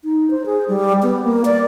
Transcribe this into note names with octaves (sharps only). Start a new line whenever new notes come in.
D#4
C5
G#4
G3
B3
A#3
D5